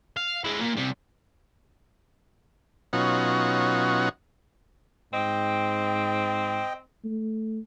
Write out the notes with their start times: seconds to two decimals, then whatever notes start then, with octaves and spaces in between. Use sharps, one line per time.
0.17 F5
0.44 G#3 E4
0.60 A#2 A#3
0.77 C3 G3
2.93 B2 F#3 C#4 D#4 F4 F#4
5.13 G#2 C4 D#5 G5
7.04 A3